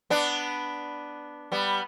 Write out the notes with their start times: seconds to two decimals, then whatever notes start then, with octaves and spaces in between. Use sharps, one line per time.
0.10 B3 D4
1.52 G3 B3